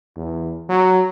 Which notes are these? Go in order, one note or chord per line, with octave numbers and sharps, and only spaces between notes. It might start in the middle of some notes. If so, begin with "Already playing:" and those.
E2
F#3